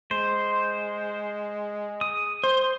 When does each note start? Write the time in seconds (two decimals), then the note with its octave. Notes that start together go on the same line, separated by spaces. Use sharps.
0.11 G#3 C5
2.01 D#6
2.44 C5